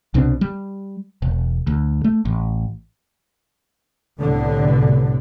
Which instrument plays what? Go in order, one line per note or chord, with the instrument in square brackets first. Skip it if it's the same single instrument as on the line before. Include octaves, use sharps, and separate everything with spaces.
[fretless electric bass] C2 B2 C4 D4
G3
E1
D2
A3
A1
[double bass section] C2 A2 D3 B3